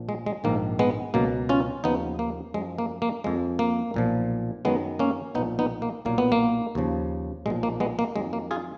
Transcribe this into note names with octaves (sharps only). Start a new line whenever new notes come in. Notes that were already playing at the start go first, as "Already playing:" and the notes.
Already playing: A#1 A#2 F3
G#3
G#3
A#1 G#2 D#3 A#3
G#3 B3
C#2 B2 F#3 A#3
C#4 F4
D#2 C#3 F3 B3 D#4
A#3
F#2 F3 G#3
A#3
A#3
F2 F3 G#3
A#3
B1 A#2 F3
F#2 D#3 F#3 G#3 B3
A#3 C#4
B1 A#2 F3 B3 D#4
B3 D#4
A#3
B1 A#2 F#3 A#3
B3
A#3
D#2 C#3 F3
B1 A#2 F3 G#3
A#3
G#3 B3
A#3
F2 D#3 F#3 G#3
A#3
F4 G#4